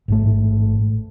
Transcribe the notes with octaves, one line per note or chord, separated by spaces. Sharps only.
A1 G#2 A3